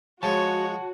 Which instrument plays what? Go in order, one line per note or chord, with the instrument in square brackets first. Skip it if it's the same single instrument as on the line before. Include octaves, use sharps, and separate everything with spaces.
[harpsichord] F3 G#3 [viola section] F#4 [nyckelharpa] C#5 [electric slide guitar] F#5 A5